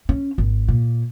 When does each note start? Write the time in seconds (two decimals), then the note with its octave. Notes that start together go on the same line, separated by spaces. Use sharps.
0.09 C#4
0.38 G#1
0.68 A#2